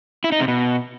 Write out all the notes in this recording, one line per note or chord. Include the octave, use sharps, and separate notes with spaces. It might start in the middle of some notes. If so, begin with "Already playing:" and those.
E4
D#4
C3
B2